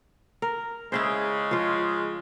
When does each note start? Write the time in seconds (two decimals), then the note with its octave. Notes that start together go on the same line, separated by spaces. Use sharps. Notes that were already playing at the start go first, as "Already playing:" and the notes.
0.42 A#4
0.92 C#3 G#3 E4 G#4 C5
1.51 F3 F4